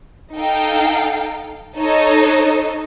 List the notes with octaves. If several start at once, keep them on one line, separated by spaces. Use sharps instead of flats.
D#4 A4 F5 G5
D#4 A4 C#5 D#5